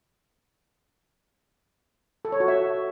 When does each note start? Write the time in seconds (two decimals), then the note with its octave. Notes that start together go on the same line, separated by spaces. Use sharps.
2.25 A4
2.32 C#5
2.40 F#4
2.48 E5